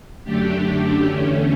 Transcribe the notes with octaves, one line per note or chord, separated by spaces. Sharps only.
F#2 D3 A3 D4 G4
E2 D3 A3 C#4